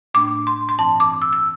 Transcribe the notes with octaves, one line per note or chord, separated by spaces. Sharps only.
A2 A3 D4 D6
C6
C6
G2 E3 C4 A5
D6
E6
E6